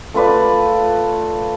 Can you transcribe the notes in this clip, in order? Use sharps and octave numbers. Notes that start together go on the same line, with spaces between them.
A3 F4 B4 D5